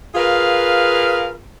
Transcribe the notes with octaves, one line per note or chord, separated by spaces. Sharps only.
F4 G#4 A#4 B4 F5